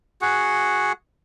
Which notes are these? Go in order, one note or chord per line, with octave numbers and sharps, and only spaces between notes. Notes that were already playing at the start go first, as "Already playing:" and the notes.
F#4 G#4 F#5